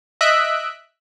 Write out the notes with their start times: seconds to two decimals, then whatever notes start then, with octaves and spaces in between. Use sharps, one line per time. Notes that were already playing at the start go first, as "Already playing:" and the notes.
0.21 D#5 E5 F#6 B6 D7